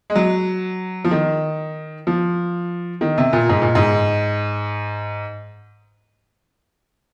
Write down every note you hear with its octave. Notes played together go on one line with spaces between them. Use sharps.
G#3
F#3
F3
D#3
F3
D#3
C3
A#2
G#2
A#2
G#2